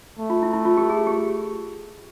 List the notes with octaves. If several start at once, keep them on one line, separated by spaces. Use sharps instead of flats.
A3
F4
E4
E4
F4
G4
G#4
G4